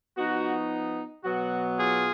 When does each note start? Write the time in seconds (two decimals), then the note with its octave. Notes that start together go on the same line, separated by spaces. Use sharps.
0.16 F3 B3 D#4 F#4
1.23 B2 F#3 B3 F#4
1.78 F4 G#4